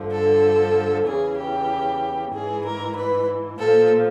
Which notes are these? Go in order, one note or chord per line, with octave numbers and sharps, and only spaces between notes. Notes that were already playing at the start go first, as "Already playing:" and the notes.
Already playing: G2 D3 F3
A4
E2 C#3 E3 G#4
G4
G#2 E3 G#4
A#4
B4
A#2 F3 A4